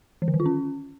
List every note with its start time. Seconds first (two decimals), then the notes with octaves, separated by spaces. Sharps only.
0.22 E3
0.28 D3
0.34 D#3
0.40 F4
0.46 C#4